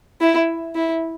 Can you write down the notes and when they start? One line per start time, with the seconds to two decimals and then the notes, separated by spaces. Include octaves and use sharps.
0.21 E4
0.75 E4